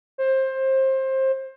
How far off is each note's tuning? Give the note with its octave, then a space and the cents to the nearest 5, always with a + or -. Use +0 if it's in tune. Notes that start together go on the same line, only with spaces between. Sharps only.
C5 +20